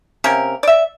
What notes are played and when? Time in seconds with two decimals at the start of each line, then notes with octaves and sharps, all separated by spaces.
0.24 C3 A#3 C#4 A#4
0.63 D5 E5